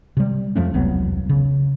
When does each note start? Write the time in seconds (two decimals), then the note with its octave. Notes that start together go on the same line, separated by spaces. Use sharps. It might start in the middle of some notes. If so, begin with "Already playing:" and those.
0.17 C3 G3
0.56 F2 F3 A3 C#4
0.74 E1 C2 F#3 B3
1.29 C#3